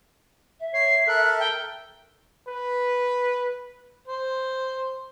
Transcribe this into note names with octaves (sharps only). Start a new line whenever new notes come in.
E5
C#5 C7
A4 A#4 F#6
G5
B4
C5